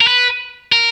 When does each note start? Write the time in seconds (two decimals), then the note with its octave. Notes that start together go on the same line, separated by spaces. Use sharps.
0.01 A#4
0.07 B4
0.72 A#4